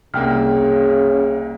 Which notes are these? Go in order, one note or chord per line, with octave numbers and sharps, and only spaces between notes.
C2 C#3 A#3 G5 F6